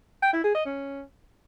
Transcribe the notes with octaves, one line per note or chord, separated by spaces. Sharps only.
G5
E4
G#4
D#5
C#4